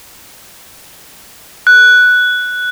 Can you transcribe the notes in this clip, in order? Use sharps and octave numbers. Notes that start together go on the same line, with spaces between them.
F#6